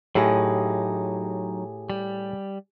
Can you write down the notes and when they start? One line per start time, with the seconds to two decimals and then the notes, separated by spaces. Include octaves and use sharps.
0.15 A2 F#3 D#4 G4 G#4 G#5
1.90 G3